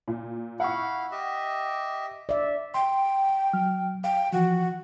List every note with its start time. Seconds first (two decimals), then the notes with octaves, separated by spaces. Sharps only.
0.08 A#2
0.60 E4 F5 F#5 C#6
1.11 G4 D#5 E5
2.29 D5 E5
2.74 G5 C6
3.53 F#3 F6
4.04 F5 G5
4.33 E3 F3 F#4